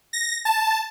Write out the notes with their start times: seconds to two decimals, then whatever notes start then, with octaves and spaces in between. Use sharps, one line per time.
0.13 A#6
0.45 A5